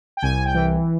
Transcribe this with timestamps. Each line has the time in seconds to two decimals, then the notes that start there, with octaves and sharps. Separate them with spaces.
0.17 G5
0.22 C2 G#5
0.45 G5
0.54 E3